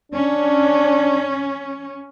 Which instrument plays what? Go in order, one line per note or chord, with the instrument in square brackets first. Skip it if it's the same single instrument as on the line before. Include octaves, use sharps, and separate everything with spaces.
[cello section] C#4 [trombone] D4